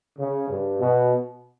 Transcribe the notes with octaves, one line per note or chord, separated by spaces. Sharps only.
C#3
G2
B2